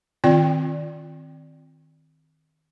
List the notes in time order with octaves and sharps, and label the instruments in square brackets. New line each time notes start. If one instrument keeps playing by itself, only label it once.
[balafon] D#3 C4 F4 D5 G5